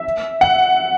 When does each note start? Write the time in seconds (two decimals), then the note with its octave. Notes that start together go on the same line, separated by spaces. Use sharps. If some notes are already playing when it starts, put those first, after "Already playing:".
Already playing: E5
0.41 F#5